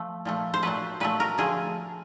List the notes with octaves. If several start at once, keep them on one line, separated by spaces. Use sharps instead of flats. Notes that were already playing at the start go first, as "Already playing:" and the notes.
Already playing: F3 A3
A#2 F3 A3
C5
A#2 F#3 A3 B4
A#2 F#3 A3 B4
A#4
D3 F3 A3 G#4